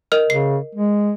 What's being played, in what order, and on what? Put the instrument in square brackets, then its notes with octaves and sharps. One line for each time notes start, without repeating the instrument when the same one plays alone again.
[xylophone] A#4 D#5 F6
[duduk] C#3 [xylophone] C7
[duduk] G#3